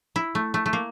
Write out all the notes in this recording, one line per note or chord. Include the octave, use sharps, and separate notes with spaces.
E4
A3
A3
A3
A#3